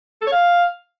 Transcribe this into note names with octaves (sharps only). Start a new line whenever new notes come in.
A4
C#5
F5